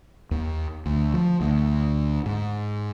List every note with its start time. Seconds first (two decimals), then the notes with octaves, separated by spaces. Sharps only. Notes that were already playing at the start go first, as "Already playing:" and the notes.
0.31 D#2
0.86 D2
1.14 F3
1.41 D2
2.26 G#2